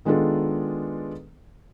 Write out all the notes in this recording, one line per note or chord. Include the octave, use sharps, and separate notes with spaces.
D#3 G#3 B3 D4 F4 A4